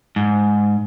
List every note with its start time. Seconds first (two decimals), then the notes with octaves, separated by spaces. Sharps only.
0.16 G#2